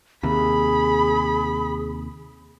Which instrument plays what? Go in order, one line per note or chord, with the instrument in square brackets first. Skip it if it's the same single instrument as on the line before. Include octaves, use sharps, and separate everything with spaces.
[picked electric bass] D#2 C3 [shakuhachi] G#4 [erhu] B5